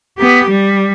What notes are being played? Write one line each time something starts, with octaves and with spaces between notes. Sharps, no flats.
B3 G4
G3